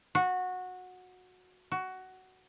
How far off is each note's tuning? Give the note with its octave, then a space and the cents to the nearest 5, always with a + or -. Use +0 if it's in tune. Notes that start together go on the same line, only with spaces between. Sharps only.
F#4 -15
F#4 +15